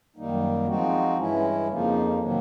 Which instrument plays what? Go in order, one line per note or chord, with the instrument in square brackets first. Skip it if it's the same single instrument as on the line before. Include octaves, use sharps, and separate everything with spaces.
[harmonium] F#2 D#3 G3 A#3 D#4
F3 G#3 C4 D#4 F#4
G2 E3 G#3 C#4 E4
F2 C#3 F3 A#3 D#4
C3 D#3 F#3 A#3